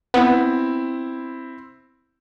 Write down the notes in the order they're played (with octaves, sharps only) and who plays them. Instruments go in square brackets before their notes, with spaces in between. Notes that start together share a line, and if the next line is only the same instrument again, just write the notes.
[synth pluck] B3 [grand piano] C4 E4